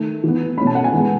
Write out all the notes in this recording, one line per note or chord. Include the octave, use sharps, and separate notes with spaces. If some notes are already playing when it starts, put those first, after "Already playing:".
Already playing: D#3 A3
E3 B3
B2 A3 C#4 B5
A5
F#5
G#5
E3 G#3 B3